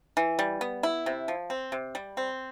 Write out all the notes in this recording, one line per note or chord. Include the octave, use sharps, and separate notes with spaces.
E3
G3
B3
E4
C3
F3
C4
C3
G3
C4